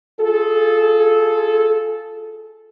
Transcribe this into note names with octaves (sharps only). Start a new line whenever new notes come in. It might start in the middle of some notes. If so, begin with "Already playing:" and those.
F4 G#4 A4